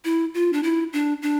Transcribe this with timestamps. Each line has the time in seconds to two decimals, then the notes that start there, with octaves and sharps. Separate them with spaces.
0.05 E4
0.34 F4
0.53 D4
0.63 E4
0.93 D4
1.22 D4